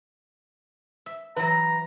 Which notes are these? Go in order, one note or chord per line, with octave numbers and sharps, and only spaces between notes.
E5
E3 F#3 B4 A#5